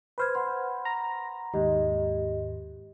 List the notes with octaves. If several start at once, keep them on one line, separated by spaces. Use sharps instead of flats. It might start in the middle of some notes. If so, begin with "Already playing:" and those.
B4 C5 B5 F6 G#6
F#5 B5 C6
A#5
D#2 G#2 G4 D#5